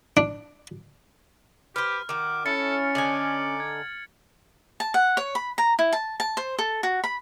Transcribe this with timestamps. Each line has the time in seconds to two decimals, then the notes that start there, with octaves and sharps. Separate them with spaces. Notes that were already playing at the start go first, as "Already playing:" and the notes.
0.17 D4
1.76 G4 B4 C5 F6
2.09 D#3 F#4 D6
2.46 C#4 E4 A4 A6 C#7
2.95 D3 D#4 G#5 D6 F#7
3.60 G#6
4.80 A5
4.94 F#5
5.17 C#5
5.35 B5
5.58 A#5
5.79 E4
5.93 A5
6.20 A5
6.37 C5
6.59 A4
6.83 F#4
7.04 B5